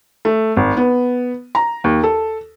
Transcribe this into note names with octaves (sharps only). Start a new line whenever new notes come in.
A3
G#1
B3
A#5
D#2
A4